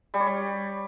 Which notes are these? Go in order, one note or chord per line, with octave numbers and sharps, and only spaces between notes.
G3
C#5
G3